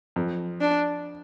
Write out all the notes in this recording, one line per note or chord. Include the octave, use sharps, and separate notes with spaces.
F2
D4